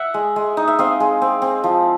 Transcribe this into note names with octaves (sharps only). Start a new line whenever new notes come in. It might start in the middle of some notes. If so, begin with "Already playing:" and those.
Already playing: E5 F#5
G#3
G#3
D#4
E5
C4 D#5 F5
G#3
C4
C4
F3